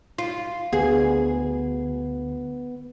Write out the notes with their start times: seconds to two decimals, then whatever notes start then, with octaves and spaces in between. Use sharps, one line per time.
0.18 F4
0.73 D2 B3 G#4